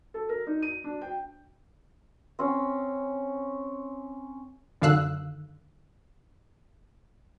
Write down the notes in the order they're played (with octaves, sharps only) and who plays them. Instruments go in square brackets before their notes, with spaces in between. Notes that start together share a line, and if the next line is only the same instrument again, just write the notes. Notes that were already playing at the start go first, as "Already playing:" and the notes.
[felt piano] A4
A#4
D#4
D#7
D4
G5
[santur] C4 C#4
[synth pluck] F#2 D3 D#3 F5 E6 F#6